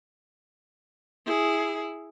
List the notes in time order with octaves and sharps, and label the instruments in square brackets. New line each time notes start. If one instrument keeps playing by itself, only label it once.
[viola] E4 G#4